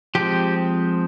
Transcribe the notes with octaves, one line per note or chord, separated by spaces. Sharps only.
F3 G#3 C4 G4